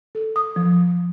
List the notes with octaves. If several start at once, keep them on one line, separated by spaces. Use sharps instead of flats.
A4
D#6
F3